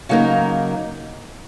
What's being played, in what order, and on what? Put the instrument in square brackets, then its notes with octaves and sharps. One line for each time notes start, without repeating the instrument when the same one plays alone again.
[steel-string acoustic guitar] C#3 F#3 A#3 D#4 A#4